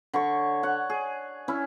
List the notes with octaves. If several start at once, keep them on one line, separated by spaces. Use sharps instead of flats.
D3 C#5 C#6
C#5 F#5
G#4
C#4 E4